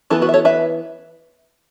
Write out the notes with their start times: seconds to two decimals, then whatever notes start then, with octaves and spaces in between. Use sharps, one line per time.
0.10 E3 B3 E4 A4
0.22 F#4 B4
0.29 E5
0.34 A4 C#5
0.45 B4 E5